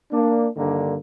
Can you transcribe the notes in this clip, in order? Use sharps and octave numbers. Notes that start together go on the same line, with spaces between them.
A#3 D4
G2 D3 D#3 A#3